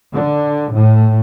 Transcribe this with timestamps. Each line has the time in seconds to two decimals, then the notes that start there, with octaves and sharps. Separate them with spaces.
0.13 D3
0.72 A2